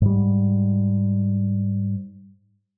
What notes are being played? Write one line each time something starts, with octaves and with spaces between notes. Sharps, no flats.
G#2 G3